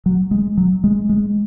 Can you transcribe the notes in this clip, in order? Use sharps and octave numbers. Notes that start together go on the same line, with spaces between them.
F#3
G#3
F#3
G#3
G#3